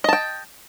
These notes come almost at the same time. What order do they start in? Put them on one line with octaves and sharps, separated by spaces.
D#5 A5 G5